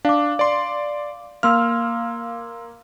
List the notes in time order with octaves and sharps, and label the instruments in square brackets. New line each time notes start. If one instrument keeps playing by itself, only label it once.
[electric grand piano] D4 [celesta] F5 D6
[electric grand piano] D5 C6
[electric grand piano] A#3 F6 [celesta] F5 C6 E6